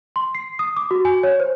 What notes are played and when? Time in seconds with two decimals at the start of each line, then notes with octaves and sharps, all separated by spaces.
0.16 C6
0.35 C7
0.59 D#6
0.77 D6
0.91 F#4
1.05 G#5
1.23 C#5
1.40 C5